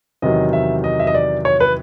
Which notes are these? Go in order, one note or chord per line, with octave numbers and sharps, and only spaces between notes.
E2 C3 D#3 F#3 D#5
E5
D#5
E5
D#5
D5
C#5
B4